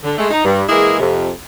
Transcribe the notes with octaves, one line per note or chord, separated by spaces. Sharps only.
D3
G#3 A3
D#4
G2
E3 G#3 A#3 E4 G#4
F2 C3